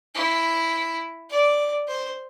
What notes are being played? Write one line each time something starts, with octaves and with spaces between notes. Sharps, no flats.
E4
D5
C5